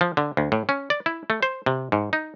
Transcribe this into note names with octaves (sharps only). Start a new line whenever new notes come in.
F3
D3
D2
A2
C#4
D5
E4
A3
C5
C3
G#2
D#4